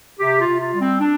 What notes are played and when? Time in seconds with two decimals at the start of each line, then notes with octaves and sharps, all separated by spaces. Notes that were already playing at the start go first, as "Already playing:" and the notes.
0.19 C3 G4
0.40 F4
0.46 C3
0.60 F4
0.73 G3
0.80 C4
1.00 D4